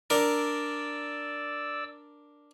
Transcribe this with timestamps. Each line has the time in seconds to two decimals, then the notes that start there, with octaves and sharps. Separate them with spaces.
0.10 D4 A#4 D5 E6